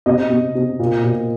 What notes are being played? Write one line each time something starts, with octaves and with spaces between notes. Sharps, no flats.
C3 D#5
C3
C3
A#2
A#2